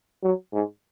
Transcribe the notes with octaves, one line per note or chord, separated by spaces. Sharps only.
F#3
G#2